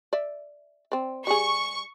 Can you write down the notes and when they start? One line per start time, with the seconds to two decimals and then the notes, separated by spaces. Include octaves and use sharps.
0.13 D5 E5
0.92 C4 D5
1.27 G3 G#4 C#6